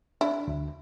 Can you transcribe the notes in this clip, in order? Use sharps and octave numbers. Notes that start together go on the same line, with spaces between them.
D4 E4
D2